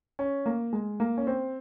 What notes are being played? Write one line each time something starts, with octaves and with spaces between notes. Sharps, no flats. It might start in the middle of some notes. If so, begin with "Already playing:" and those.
C#4
A#3
G#3
A#3
C#4
C4